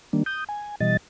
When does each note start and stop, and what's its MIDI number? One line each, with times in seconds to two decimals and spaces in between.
0.13 0.23 51
0.13 0.23 55
0.13 0.23 58
0.13 0.23 62
0.26 0.44 87
0.26 0.44 91
0.49 0.75 80
0.80 0.97 47
0.80 0.97 52
0.80 0.97 55
0.80 0.97 75
0.80 0.97 93